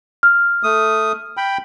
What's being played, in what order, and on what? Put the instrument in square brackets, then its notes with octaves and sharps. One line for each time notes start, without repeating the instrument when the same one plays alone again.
[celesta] F6
[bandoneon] A3 D#6
G5 B5